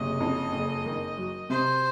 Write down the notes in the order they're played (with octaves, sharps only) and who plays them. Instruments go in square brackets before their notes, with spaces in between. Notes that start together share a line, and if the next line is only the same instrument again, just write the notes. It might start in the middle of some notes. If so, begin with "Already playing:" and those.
Already playing: [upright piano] F#1 C3 [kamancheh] D#5
[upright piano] F2
F#1
D#3
F#3
[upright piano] C3 [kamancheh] C5